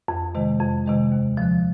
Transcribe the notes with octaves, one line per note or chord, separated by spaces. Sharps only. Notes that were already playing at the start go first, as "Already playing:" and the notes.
F2
C3 D#3 G#3
F2
C3 D#3 G#3
D#2
D3 F3